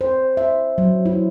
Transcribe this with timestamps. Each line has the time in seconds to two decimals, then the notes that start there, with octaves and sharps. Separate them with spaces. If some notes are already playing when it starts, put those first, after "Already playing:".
0.01 C5
0.37 E5
0.78 F#3
1.06 E4